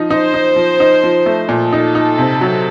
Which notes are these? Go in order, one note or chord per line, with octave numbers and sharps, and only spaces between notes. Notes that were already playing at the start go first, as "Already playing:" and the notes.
Already playing: F3 D#4
D#4 C5
D#4
F3
D#4
F3
A3
A#2 A4
D#4
D#4
C3
F#3